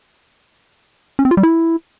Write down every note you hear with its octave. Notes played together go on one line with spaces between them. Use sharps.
C#4
C4
F4
G3
E4